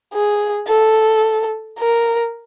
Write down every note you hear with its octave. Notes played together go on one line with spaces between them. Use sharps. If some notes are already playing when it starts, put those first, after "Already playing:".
G#4
A4
A#4